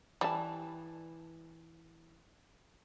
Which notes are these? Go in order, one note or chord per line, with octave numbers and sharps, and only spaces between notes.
E3 G3 A5